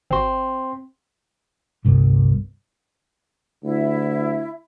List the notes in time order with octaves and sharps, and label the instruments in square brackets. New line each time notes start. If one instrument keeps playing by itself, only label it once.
[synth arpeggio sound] G#1 F#4 [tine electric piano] C4 C6
[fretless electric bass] G1 C2 G2
[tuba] D2 [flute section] E4